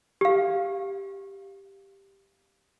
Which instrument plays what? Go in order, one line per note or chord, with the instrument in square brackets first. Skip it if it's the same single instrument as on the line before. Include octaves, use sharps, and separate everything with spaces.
[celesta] G4 F5